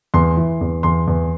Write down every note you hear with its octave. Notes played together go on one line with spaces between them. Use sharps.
E2 C6
E3
E2
E2 C6
E2